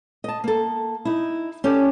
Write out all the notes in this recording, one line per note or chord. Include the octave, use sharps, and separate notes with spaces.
D#5 A5
A#3 A4
D#4 E4
C#4 G4 A4 D5